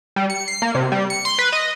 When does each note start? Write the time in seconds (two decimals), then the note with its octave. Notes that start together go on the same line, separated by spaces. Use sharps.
0.16 G3
0.30 C#7
0.48 C7
0.62 A#3
0.75 C3
0.92 G3
1.10 C#7
1.25 C6
1.38 B4
1.52 D#5